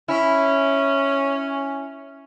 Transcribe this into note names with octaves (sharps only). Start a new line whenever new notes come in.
C#4 E4